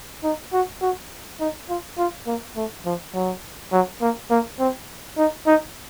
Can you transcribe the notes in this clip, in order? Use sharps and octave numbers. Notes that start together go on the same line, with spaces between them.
D#4
F#4
F#4
D#4
F4
F4
A#3
A3
F3
F#3
F#3
A#3
A#3
C4
D#4
D#4